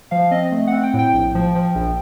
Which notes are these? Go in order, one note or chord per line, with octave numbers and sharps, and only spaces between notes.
F3 F5
C4 D#5
A3
F#5
C4
G5
A2
G5
A#1
F3
F3
A#1